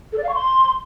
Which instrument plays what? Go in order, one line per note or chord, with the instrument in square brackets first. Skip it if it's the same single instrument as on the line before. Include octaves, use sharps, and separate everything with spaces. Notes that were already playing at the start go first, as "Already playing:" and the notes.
[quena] A4
D5
F5
C#6
C6